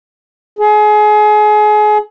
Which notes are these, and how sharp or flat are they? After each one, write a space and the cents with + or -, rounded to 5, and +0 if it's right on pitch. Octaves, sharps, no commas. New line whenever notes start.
G#4 +30